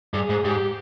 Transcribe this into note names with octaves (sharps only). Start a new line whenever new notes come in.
G2 G#4
G#2
G#2 G4